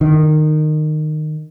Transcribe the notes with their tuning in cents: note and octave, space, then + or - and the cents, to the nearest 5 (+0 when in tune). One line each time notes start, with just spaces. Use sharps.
D#3 -20